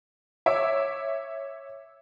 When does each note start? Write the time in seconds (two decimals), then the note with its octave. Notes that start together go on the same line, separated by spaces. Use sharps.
0.46 C#5 E5 D6